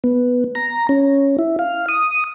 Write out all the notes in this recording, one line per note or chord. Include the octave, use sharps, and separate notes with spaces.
B3
A#5
C#4
E4
F5
D#6